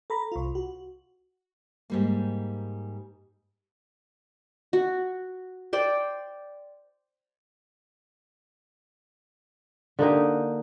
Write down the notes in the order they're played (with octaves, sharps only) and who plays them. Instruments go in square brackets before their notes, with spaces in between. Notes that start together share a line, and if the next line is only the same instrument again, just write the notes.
[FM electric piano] A4 A#5 B5
C2 F4
F#4
[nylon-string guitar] G#2 G3 A#3
[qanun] F#4
C5 D5 G5
[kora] D3 A#3 D#4 G4